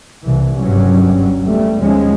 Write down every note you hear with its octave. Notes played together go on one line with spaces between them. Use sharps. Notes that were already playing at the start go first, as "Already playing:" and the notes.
C2 E3
F#1 G2 F#3 G3 C#4
E2 G3 A3
D#2 F3 G#3 C#4